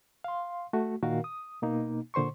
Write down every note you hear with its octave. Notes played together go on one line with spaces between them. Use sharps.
F5 C6
A3 F#4
A#2 D#3 F#4 A#4 F5
D#6
B2 A#3 D#4
A#2 D3 C5 C6 C#6